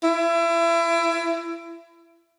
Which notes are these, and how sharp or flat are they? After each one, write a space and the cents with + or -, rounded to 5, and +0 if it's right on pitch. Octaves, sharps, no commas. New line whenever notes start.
E4 +30